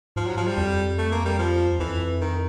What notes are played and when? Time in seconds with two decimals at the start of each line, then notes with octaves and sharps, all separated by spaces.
0.16 G#2 F3
0.27 F#3
0.37 F3
0.47 G3
0.57 F2
0.98 A3
1.12 A#3
1.25 G3
1.39 F3
1.79 F2 E3
2.21 D#3